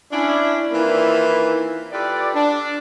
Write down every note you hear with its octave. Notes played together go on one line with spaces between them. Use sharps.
C#4 D4 E4
D#3 E3 A#3 C4 E4 F4
F4 G4 A4 B4 D5
D4